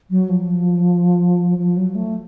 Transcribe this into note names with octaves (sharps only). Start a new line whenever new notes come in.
F#3
F3
F3
F#3
A3